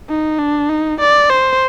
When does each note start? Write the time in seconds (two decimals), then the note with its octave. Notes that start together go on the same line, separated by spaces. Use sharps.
0.09 D#4
0.39 D4
0.70 D#4
1.00 D5
1.30 C5